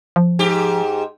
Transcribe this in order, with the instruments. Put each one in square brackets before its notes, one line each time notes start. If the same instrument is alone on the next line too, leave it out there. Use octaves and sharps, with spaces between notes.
[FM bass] F3
[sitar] G#2 G4